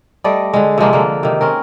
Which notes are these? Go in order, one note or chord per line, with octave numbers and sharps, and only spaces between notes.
G3 A3 D5 D#5
D3 G#3
C3 F3 G#3 A#3
D3 A#3
C3 D#3
C4 C#4 A#4